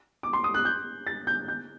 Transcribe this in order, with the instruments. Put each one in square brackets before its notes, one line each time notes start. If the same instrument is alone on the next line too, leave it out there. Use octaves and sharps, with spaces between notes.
[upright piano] D6
C6
D#6
F#6
G6
A6
G6
G6